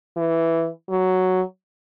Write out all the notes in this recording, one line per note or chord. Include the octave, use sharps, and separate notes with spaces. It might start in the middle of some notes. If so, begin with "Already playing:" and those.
E3
F#3